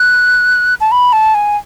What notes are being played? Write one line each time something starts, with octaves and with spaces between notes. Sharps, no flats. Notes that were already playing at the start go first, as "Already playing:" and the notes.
Already playing: F#6
A5
B5
A5
G#5